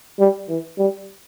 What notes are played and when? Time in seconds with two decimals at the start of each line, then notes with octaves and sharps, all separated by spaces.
0.19 G3
0.49 E3
0.78 G3